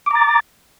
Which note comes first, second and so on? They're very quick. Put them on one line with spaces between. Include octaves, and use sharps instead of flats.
D6 A#5 A6